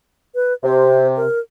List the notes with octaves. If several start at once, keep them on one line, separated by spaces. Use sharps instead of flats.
B4
C3 C5
A#4